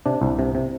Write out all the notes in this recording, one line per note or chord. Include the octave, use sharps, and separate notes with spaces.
C3 D4
C2
C3
C3